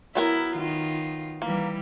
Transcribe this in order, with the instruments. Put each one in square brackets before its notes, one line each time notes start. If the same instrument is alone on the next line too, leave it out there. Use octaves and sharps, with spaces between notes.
[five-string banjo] F#3 B3 A#4 [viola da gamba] E4
[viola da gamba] D#3 F4
[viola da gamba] E3 G3 [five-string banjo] A#3